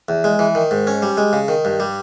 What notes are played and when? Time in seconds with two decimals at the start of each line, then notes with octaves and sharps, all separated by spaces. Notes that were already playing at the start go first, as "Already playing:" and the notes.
0.09 E2
0.24 G#3
0.39 E3
0.55 D#3
0.71 G#2
0.87 C#4
1.02 G3
1.17 G#3
1.33 C#3
1.48 D#3
1.65 G2
1.80 G3